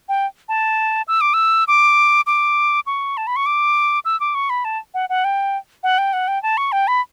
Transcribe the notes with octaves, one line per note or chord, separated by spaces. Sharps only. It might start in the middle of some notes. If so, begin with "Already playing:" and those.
G5
A5
E6
D6
E6
D6
D6
C#6
A5
B5
C#6
D6
E6
D6
C#6
B5
A5
F#5
F#5
G5
F#5
G5
F#5
G5
A5
C#6
G5
B5